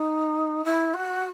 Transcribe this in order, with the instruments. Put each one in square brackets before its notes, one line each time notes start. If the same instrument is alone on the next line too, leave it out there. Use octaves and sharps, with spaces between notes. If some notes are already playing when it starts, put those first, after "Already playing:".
Already playing: [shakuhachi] D#4
E4
F#4